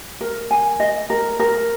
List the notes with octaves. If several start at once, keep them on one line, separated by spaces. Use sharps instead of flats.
A#4
G#5
D#5
A#4
A#4